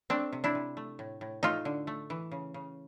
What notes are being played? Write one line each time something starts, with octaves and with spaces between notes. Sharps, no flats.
A3 C4 D4
C3
D4 E4
C3
A3
A2
A2
A3 D#4 F4
D3
A3
E3
C#3
C#3